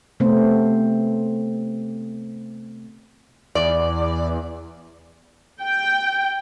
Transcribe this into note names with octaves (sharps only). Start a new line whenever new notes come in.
C3 A3 B3 C4 C5
E2 D5
G5